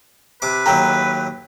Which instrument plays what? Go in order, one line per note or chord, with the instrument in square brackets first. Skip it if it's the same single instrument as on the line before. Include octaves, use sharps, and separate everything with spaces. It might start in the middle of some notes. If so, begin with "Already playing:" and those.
[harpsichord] C3 D6 [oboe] B4
[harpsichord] D#2 F#3 A3 [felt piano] G5 A#5